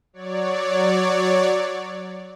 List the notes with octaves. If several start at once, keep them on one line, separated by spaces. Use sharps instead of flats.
F#3 C#5 D5